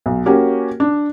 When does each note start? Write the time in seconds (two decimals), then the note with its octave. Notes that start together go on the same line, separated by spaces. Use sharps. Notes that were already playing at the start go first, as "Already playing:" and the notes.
0.06 B1
0.26 A#3 C#4 F#4 G4
0.80 D4